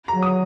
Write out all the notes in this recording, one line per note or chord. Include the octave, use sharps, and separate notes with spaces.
A#5
F#3
D#6